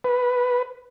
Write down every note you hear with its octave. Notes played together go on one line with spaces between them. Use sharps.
B4